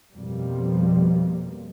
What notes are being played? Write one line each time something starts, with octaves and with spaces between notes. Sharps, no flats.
F2 B2 F3 G3 A#3